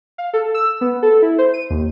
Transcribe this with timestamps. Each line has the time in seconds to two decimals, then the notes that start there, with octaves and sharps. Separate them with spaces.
0.18 F5
0.33 A4
0.54 E6
0.81 B3
1.03 A4
1.22 E4
1.38 C5
1.54 D#7
1.70 D#2